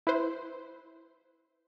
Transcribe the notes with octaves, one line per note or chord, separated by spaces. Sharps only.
E4 B4 C5